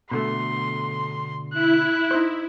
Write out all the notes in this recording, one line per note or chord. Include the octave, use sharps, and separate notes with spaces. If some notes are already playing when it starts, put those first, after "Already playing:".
B2 D3 A3 C6
E4 F#6
D#4 C5